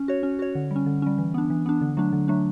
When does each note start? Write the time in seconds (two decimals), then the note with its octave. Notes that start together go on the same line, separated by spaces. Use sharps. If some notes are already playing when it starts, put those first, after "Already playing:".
Already playing: C#4
0.08 F#4 C#5
0.23 C#4
0.39 F#4 C#5
0.55 D3
0.71 G3 C#4
0.86 D3
1.02 G3 C#4
1.18 E3
1.34 B3 D4
1.50 E3
1.66 B3 D4
1.81 D3
1.97 F#3 A3 D4
2.12 D3
2.28 F#3 A3 D4